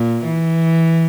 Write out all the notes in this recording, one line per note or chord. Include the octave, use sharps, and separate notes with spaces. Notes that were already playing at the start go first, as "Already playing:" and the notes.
Already playing: A#2
E3